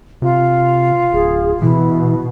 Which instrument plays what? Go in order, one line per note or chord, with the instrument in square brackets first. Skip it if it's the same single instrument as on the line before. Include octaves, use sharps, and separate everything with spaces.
[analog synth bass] C3 [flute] F4
[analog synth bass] D1 [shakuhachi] G#4
[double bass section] B2 [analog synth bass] E3 [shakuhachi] E4